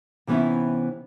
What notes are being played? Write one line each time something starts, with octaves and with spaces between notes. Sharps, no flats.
C3 E3 B3 C#4 D#4 E4